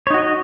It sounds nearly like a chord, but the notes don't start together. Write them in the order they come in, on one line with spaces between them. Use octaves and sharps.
C#5 D#4 F#4 D#5